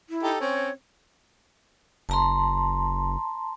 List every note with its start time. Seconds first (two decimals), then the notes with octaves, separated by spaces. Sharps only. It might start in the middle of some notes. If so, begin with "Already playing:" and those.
0.10 E4
0.23 D#4 G4 A4
0.40 C4 C#4 C#5
2.09 F#1 A5 A#5 C6